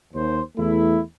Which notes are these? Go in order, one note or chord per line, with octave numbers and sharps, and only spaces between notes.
D#2 C5
E2 A3 E4